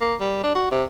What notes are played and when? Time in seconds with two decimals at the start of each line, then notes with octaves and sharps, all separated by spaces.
0.01 A#3
0.20 G3
0.43 D4
0.55 F#4
0.71 C3